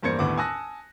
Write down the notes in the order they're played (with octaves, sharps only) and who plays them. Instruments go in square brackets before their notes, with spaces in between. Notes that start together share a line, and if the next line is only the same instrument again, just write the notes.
[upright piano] E2 G2 A#3 C5 G#6 C#7
G1 D#2 A2 B3 F#5 D6
G#5 A5 D#6 E6 F#6 A#6